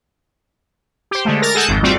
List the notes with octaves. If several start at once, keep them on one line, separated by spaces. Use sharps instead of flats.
G4 C5
D3 G#3 A3
A#4 A6 A#6
G#4 A4 F#5 A5 G6
G#1 F2 G#2
G3 A3 C4 F4 F#4 D5